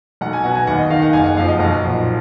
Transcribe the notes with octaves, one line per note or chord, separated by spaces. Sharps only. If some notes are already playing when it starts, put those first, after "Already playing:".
B1 F#5
G#5
B2 F#5
G#5
D#2 F#5
D#5
D#3 F5
F#5
F#1 G#5
F#5
F2 F3 F5
D#5
B1 F#5
A#2 F3